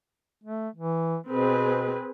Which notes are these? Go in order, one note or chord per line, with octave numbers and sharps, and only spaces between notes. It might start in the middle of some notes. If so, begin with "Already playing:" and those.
A3
E3
B2 C4 G#4 B4